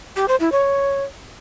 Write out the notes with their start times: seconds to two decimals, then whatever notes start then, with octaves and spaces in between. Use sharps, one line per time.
0.16 G4
0.28 C5
0.40 E4
0.52 C#5